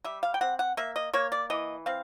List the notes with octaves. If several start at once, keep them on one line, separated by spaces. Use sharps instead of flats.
G3 E5
F5
G5
C4 F#5
F#5
A#3 E5
D#5
A#3 C#5
D5
E3 D#5
C4 F5